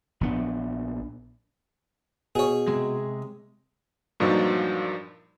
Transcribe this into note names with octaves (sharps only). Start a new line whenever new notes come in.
A#1 B3 D4
B2 G#4 C#5
C3 G#3
G2 A#2 F3 F#3 D#4